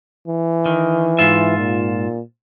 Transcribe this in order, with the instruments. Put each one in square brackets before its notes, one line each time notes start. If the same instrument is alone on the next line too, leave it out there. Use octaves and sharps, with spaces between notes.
[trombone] E3
[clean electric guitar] D#3
G#2 F4 E5
[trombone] A#2